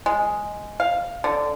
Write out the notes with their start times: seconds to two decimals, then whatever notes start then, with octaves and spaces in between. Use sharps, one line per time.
0.06 G#3
0.80 F5
1.24 D3